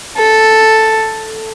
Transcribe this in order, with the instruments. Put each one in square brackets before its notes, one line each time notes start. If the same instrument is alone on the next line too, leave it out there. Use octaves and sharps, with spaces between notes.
[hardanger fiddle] A4